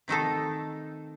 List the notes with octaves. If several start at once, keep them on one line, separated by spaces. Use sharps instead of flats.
C3 D#3 A3 D#4 A4